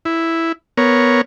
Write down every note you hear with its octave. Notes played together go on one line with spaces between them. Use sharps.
E4
B3 A#4 C#5